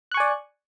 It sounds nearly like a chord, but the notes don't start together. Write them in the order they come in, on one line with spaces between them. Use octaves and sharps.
F#6 C#6 G#5 D5